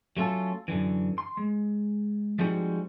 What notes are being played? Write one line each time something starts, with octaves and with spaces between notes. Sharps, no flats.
F#3 A3 C#4 F4 A4
F#2 D3 E3
C6
G#3
F3 G3 G#3 C4 D#4 F#4